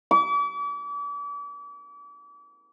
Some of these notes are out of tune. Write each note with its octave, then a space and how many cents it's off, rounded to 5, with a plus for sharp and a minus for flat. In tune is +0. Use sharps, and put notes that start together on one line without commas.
D6 -40